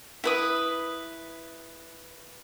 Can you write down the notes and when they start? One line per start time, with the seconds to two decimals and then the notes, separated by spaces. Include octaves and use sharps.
0.24 E4 B4 D#6